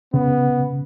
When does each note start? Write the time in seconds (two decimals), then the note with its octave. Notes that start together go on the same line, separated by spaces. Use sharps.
0.14 C#3 B3